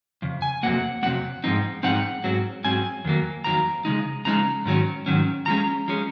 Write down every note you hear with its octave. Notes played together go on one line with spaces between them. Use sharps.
F2 C#3
G#5
F2 C3 F#3 A#3 F#5
F2 C3 F#3 A#3 F#5
G#2 F3 C4 D#4
G#2 F3 C4 D#4 F#5
G#2 F#3 C4
G#2 F#3 C4 G#5
F2 D#3 F#3 A#3
F2 D#3 F#3 A#3 A#5
C#3 F3 G#3 D#4
C#3 F3 G#3 D#4 A#5
G#2 D#3 F#3 C#4
G#2 D#3 F#3 C#4
F#2 F3 G#3 C#4 A#5
F3 G#3 C#4